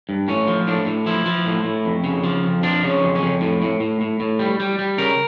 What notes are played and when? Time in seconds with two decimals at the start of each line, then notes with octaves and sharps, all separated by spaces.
0.09 G2
0.28 A2 C#4
0.47 F3
0.67 A2 D4
0.86 A2
1.06 F3 E4
1.26 F3
1.46 A2
1.65 A2
1.85 F2
2.04 C#3
2.24 F3
2.44 F2
2.63 F3 D4
2.83 C#3
2.89 C#4
3.02 F2
3.15 C#4
3.22 F2
3.41 A2
3.62 A2
3.80 A2
4.01 A2
4.20 A2
4.39 G3
4.60 G3
4.79 G3
4.98 C#3 A#4